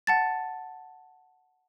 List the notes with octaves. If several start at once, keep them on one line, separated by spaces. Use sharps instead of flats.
F#5 A5 A6